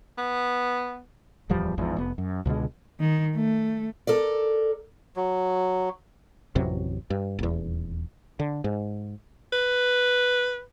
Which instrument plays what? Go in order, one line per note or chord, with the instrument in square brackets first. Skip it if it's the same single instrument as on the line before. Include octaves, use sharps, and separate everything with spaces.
[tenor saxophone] B3
[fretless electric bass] D1 E2 F3 G3
G#1 E2 G#2 F3
F1 B3
F#2
C#2 B2 D3 G#3
[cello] D#3
A3
[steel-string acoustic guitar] A4 A#4 D5
[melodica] F#3
[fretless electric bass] A1 F2 C3 F#3
G2
D#1 E2
D3
G#2
[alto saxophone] B4